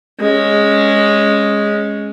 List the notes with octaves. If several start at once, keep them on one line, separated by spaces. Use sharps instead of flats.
G#3 C#4